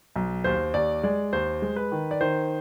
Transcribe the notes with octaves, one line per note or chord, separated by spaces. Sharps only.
B1
D#2 C5
D#2 D5
G#3 D5
D#2 C5
G#3
B4
D#3
D5
D#3 C5